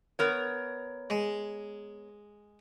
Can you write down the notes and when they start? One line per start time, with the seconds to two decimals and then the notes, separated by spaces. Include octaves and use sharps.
0.19 B3 A#4 C#5
1.10 G#3